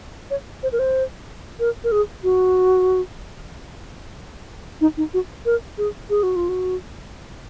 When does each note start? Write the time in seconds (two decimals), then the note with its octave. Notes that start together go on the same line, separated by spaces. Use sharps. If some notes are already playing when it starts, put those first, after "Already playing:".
0.30 C#5
0.63 C5
0.72 A#4
0.79 C5
1.60 A#4
1.84 A#4
1.92 G#4
2.24 F#4
4.81 D#4
4.97 D#4
5.14 F#4
5.46 A#4
5.78 G#4
6.10 G#4
6.23 F#4
6.36 F4
6.49 F#4